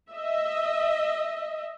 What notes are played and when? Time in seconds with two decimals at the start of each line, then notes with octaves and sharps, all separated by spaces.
0.10 D#5 E5